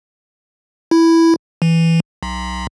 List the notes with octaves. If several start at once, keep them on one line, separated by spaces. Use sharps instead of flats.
E4
E3
B1